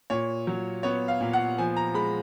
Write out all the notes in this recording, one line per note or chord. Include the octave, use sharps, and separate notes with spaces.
A#2 C#5
F#3
B3 C#5
F5
A#2
F#5
F3 G#5
A#5
G#3 B5